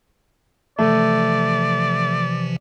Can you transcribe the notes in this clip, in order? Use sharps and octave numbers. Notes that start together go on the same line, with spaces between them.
C3 E3 F3 A3 D5